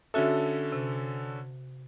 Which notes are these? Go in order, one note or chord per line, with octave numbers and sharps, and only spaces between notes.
D3 C#4 F#4 A4 E5
C3